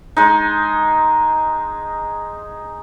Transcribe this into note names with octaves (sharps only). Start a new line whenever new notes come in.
G#3 D#4